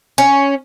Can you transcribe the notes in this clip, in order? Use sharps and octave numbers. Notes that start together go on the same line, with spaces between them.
C#4